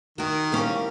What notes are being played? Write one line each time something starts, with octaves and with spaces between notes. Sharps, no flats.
D#3 F#4 A#4
A2 G3 A#3 C4 C#4